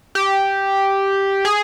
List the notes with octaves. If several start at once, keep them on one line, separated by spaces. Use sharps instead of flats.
G4
G#4